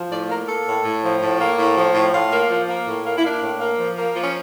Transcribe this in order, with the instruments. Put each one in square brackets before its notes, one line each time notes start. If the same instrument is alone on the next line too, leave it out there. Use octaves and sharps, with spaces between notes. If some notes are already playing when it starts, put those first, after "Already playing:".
Already playing: [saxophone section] F3
A2 D5
A#3 A#4
A#3 A4
A2
A2
F3
A2
A#3
A2
F3
A2
A2 F4
A#3
F3
A#3
A2
A#3
E4
A#3 D4
A2
A#3
F3
A#3
F3
C#4